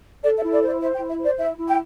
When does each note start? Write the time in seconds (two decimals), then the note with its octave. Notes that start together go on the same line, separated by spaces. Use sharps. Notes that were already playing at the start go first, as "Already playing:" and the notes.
0.24 A4 D5
0.38 E5
0.43 E4
0.52 D5
0.62 C5 D5
0.81 C5 E5
0.95 G5
0.99 E4
1.09 E5
1.19 C5 D5
1.38 E4 E5
1.57 E4
1.67 G5